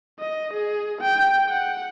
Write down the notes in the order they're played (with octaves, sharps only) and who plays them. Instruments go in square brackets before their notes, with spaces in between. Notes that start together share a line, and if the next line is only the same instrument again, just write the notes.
[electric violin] D#5
G#4
G5
F#5